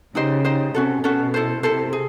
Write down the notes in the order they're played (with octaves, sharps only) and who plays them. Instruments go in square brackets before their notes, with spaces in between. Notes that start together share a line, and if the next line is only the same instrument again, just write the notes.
[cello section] C#3 [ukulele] D#4 G4 C5 D#5
[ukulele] D#4 G4 C5 D#5
[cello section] C3 [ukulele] C#4 F#4 A4
[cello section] B2 [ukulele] C#4 F#4 A4
[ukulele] E4 A4 C5
[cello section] C3 [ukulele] E4 A4 C5
[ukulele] G#4